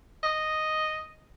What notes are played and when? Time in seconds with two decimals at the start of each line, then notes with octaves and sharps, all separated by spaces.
0.23 D#5